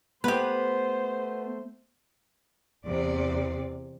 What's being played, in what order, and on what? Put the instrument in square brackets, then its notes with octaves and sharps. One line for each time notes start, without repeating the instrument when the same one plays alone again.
[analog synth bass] A3 [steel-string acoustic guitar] B3 [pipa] G4 B4 [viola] C5
[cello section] E2 C3 D5